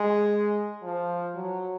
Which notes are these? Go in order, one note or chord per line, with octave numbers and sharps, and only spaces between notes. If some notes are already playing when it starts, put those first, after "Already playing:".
Already playing: G#3
F3
F#3